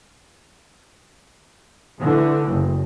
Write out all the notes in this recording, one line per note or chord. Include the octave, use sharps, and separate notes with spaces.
D3 E3 A3
F#1